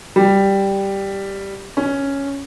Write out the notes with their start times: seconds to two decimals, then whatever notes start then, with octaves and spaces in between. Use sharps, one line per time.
0.16 G3
1.77 C#4